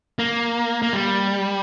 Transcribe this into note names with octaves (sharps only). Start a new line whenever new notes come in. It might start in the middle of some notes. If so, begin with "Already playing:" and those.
A#3
A#3
G3